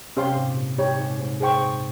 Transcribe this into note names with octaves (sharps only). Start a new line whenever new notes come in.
C3 C#4 G4 C5 F5 C6
G#2
A#2
G#2 D#4 G4 C#5
G#2
G#2
G#4 C5 G5 C#6